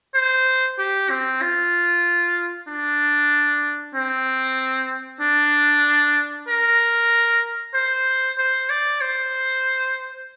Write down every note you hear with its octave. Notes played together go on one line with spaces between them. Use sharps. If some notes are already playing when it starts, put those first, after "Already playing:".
C5
G4
C4
F4
D4
C4
D4
A#4
C5
C5
D5
C5